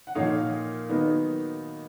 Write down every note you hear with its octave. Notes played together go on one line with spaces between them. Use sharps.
F#5
A#2 F3 A#3 D#4 C#5 F5
D#3 F#3 B3 D#4